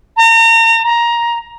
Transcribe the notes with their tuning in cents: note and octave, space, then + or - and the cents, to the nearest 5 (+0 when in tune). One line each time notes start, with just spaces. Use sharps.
A#5 -40
A#5 +15